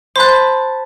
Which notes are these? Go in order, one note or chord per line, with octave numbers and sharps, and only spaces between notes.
C5 A5 B5 C6 F#6